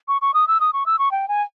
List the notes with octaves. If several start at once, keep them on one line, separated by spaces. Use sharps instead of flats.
C#6
C#6
D#6
E6
D#6
C#6
E6
C#6
G5
G#5